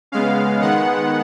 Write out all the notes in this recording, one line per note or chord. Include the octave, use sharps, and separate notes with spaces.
C#3 G#3 B3 F5
D#3 G#3 B3 F#5